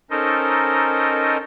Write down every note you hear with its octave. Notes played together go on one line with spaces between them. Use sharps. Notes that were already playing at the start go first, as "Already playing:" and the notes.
C#4 D#4 A4 A#4 C5 D#5